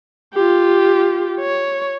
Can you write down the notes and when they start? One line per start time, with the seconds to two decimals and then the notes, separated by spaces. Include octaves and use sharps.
0.34 F4 G4
1.40 C#5